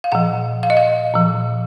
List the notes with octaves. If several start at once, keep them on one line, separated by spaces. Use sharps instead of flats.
F5
A#2 F3 F#5
F5
D#5
F5
A#2 F3